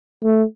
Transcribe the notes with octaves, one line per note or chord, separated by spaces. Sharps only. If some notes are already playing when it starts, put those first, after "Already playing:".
A3